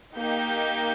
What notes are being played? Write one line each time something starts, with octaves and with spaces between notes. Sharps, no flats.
A#3 D#4 G4 G6